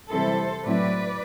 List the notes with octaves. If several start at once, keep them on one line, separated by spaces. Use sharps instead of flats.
C3 E3 G3 C4 E4 A4 C5
A2 F#3 C4 E4 B4 D5